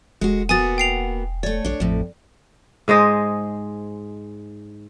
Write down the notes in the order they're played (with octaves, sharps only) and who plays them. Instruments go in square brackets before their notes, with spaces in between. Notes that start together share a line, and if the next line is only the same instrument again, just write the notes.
[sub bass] E1 [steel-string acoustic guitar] G#3 F#4
[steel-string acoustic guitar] A#3 B3 F#4 [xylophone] G#5 D#6 A6
[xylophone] G5 C7 F7
[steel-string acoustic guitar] A3 C#5 [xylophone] D5
[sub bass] A#1 [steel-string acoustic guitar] D4 C#5
[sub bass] A1 [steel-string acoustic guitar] F2 A2
[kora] G#2 G#3 C5 D#5